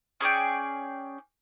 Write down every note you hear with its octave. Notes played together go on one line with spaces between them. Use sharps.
C#4 G#4 D5 G5